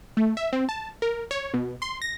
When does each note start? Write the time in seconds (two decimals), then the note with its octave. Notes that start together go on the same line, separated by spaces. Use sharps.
0.17 A3
0.37 E5
0.53 C4
0.69 A5
1.02 A#4
1.31 C#5
1.54 B2
1.82 C6
2.02 A#6